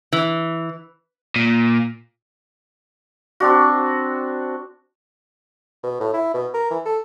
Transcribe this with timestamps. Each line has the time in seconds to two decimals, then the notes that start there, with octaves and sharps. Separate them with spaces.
0.13 E3
1.36 A#2
3.40 C4 D4 F#4
5.83 B2
6.00 A2
6.14 E4
6.34 B2
6.54 A#4
6.71 E3
6.86 A4